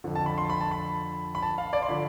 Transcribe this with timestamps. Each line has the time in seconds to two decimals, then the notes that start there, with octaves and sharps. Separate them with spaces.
0.04 F2 D3 F3
0.15 A5
0.26 B5
0.38 C6
0.49 B5
0.61 A5
0.71 B5
1.35 B5
1.42 A5
1.58 F5
1.73 D5
1.82 C6
1.89 D3 F3 B5